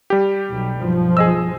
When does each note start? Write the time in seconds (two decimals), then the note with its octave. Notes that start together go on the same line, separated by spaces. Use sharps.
0.10 G3 G4
0.49 B1 B2
0.80 B1 G2 F3
1.17 G#4 D#5 E6